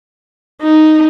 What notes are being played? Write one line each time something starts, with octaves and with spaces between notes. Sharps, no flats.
D#4